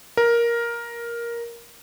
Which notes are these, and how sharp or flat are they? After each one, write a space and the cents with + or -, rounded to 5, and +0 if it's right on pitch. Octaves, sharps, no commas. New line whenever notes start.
A#4 +10